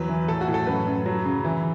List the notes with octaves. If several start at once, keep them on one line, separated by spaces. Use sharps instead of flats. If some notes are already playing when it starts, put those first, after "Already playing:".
Already playing: E2 F#3 B4
E3
A2 A4
F#4
A2
A4
F#2 B4
F#2
F#3
C#3
E3